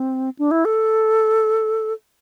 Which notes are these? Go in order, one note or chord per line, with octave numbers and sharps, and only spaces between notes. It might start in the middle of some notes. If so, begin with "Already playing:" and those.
Already playing: C4
D4
E4
A4